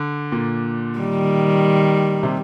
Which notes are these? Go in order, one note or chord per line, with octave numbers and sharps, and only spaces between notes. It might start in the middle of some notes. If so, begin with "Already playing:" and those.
Already playing: D3
A#2
D#3 G3
C3